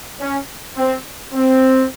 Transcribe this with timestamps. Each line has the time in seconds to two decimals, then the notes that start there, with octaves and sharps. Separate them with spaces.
0.20 C#4
0.77 C4
1.33 C4